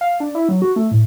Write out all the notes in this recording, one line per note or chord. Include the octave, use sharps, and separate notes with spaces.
F5
D4
E4
F#3
F#4
A3
A2